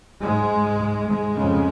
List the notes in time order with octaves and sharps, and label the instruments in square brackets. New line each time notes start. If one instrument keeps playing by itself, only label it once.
[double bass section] G#2 G#3
G#2
G#3
F2 C#3